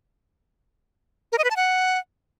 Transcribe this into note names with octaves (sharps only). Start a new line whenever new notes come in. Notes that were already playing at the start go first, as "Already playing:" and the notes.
A#4
D#5
B4
A5
F#5